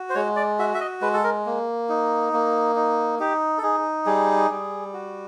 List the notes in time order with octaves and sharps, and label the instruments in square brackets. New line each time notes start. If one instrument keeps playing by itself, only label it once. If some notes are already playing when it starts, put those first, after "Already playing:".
Already playing: [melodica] F#4
C5
G#3 C#5
D5
F#4 E5
E5
D#5
G#3 B4
A4
A#4
A#3
D#4
A#3
D#4
D#4 G4
A4
D#4 G#4
G3 G#4
G3
F#4